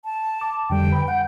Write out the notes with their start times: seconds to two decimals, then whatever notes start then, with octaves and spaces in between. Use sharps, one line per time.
0.05 A5
0.41 D6
0.70 F2 D3 G3 G5
0.92 B4 B5
1.08 F#5 G6